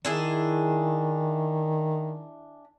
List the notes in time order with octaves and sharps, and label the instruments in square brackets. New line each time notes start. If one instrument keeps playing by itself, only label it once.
[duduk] D#3 [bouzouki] D4 E4 G#4